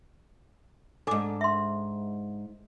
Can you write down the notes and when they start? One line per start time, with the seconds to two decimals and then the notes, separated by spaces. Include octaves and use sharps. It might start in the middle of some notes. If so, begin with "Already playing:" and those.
1.07 G#2 D4 A4 G#5 D6
1.41 E5 C6